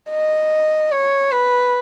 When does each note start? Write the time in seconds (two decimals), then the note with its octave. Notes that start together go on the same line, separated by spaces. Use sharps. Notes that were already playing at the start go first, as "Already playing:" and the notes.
0.10 D#5
0.92 C#5
1.32 B4